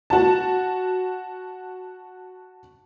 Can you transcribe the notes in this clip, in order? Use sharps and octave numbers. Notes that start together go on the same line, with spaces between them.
F#4 A5